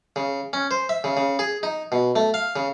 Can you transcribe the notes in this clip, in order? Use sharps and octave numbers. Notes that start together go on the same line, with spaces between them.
C#3
C#4
C5
E5
C#3
C#3
G#4
D#4
B2
A3
F5
C#3